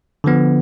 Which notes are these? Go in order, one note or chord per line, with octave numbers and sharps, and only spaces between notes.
D3 F3 B3